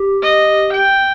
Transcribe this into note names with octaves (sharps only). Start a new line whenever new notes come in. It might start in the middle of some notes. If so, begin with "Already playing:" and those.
Already playing: G4
D#5
G5